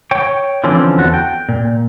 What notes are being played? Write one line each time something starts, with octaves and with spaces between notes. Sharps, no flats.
C#5 G5
D3 E3 F3 C4 C#4
E2 F#4 A4
G5
A#2